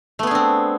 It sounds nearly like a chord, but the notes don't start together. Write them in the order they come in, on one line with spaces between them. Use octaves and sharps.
A3 B3 G#4 D4 C4